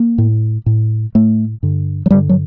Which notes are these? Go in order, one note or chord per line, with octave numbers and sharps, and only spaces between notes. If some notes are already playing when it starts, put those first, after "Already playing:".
Already playing: A#3
A2
A2
A2 A3
G2 D3
F#3
G2 D3 G3
F#3